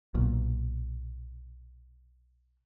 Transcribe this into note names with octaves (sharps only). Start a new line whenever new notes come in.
B1 A#2